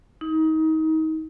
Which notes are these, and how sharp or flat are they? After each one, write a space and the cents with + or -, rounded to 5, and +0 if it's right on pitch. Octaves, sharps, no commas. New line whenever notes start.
D#4 +30